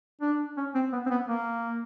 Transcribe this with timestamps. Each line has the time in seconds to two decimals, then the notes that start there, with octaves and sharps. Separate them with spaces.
0.22 D4
0.57 C#4
0.75 C4
0.93 B3
1.06 C4
1.10 B3
1.29 A#3